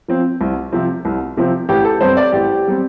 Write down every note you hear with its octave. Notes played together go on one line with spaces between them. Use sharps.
F3 C4
C2
C3 F3 C4
C2
C3 F3 C4
A1 G4
A4
G2 G3 C4 C5
D5
A1 G4
G3 C4